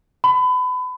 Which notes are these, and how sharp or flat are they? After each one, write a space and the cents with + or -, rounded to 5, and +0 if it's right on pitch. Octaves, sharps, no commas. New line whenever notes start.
B5 +30